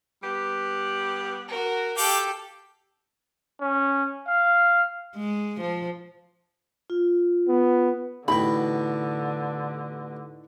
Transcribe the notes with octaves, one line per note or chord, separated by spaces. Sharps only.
G3 B3 G4
F#4 A#4
G4 A4 F5 G5 D6
C#4
F5
G#3
F3
F4
B3
A1 B2 D3 D#4 E4 G5 B5